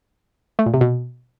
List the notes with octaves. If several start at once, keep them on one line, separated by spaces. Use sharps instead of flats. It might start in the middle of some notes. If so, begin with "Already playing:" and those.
A3
A#2
C3
B2